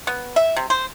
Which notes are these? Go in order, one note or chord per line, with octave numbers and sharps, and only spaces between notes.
B3
E5
C3
C5